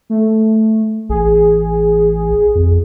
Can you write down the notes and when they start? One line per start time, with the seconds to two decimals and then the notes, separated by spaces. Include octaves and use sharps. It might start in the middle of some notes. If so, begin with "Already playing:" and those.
0.10 A3
1.09 A1 G#4
2.55 F2